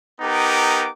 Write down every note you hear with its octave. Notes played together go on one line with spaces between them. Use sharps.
B3 D#4 G4 A#4 D6